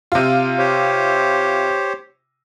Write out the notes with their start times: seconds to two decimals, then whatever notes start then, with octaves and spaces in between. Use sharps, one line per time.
0.12 C3 F4
0.58 G4 C5 C#5